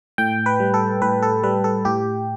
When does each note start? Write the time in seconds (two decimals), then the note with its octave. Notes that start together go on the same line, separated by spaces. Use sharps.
0.18 A2 G5
0.46 B4
0.60 G3
0.74 A4
1.02 A2 B4
1.22 A4
1.43 G3 B4
1.64 A4
1.85 A2 G4